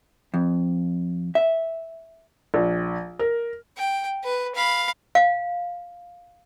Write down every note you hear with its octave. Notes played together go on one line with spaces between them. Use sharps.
F2
E5
A#1
A#4
G5
B4
F5 B5
F5